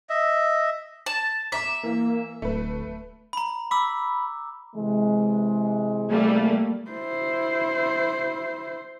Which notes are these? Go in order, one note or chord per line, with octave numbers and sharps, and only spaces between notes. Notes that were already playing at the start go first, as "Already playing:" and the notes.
D#5 E5
A5
E5 A#5 D6
E3 A#3
D1 A3 B4
A#5 B5
B5 D6 E6
C3 E3 G#3
G3 A3 A#3
E4 C5